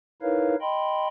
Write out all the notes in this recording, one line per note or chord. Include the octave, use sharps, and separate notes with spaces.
D#4 E4 A#4 B4 C#5 F5
D#5 G5 B5 C6